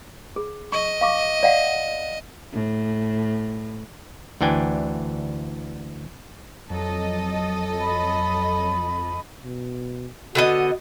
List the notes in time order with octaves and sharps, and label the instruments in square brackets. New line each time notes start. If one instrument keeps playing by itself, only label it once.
[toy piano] G#4
[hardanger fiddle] D#5 [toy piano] C#6
[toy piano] F5 C#6 D6
D5 F5 F#5
[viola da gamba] A2
[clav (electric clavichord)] D2 E3 D4 G5 G#5
[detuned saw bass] F2 [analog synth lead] F#3 [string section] A4 D#5
[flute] B5
[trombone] B2
[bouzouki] D3 B3 D#5 [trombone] F#4